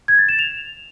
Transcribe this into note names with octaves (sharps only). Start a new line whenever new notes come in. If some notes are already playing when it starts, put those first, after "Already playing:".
G#6
A6
E7
F7